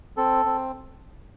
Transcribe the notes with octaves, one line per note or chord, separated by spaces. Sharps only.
C4 A4
C4